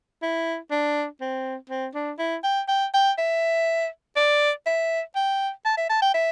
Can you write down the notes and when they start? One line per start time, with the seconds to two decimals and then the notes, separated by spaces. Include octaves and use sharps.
0.22 E4
0.71 D4
1.21 C4
1.70 C4
1.95 D4
2.19 E4
2.44 G5
2.68 G5
2.94 G5
3.18 E5
4.16 D5
4.66 E5
5.15 G5
5.65 A5
5.77 E5
5.90 A5
6.02 G5
6.14 E5